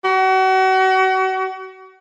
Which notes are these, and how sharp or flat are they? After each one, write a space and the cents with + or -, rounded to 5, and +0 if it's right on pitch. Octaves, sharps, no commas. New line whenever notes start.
F#4 +35